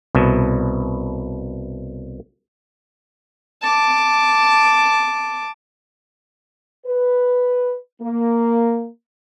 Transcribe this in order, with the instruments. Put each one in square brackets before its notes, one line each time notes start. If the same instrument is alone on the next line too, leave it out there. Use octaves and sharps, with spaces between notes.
[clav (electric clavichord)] C2 B2
[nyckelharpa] A5 D6
[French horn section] B4
A#3